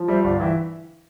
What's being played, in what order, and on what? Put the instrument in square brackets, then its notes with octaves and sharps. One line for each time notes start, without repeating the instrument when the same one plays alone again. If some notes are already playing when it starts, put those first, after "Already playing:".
Already playing: [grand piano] F3
[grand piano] G3 [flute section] C5 E5
[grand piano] G1 [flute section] D5 F5
[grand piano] E3 [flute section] E5 G5